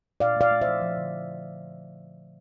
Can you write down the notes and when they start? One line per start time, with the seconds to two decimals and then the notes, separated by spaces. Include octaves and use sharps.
0.20 A#2 D5 F5
0.36 A3 D5 F5
0.51 A3
0.61 C5 E5
0.67 F3
0.81 F3
0.97 D3